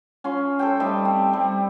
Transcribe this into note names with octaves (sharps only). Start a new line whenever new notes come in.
C#4 F4 C6
A4 C5 G5
G3 A3 D#4 E5
C4
G3